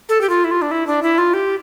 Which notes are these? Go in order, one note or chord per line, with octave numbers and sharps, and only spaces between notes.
A4
G4
F4
E4
F4
D4
E4
D4
E4
F4
G4